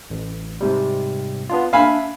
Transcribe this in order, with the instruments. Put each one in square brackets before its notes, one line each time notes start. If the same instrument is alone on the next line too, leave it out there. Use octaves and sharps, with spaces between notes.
[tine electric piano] A1
G#2 C3 G3
B3 D4 F4
[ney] D4 [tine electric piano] E5 [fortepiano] F5 G#5 B5